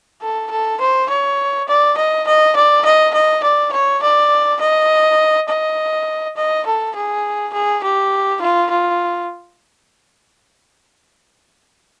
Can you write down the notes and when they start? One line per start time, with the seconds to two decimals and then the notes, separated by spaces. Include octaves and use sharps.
0.22 A4
0.51 A4
0.80 C5
1.09 C#5
1.68 D5
1.97 D#5
2.27 D#5
2.56 D5
2.85 D#5
3.14 D#5
3.43 D5
3.72 C#5
4.02 D5
4.61 D#5
5.48 D#5
6.36 D#5
6.66 A4
6.95 G#4
7.53 G#4
7.83 G4
8.41 F4
8.70 F4